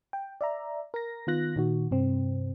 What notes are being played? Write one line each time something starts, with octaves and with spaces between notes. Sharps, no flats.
G5
D5 E5 A#5
A#4 A#6
D#3 B3 F4 F#6 A#6
A#2 D#3 F#4
G2 C3 C4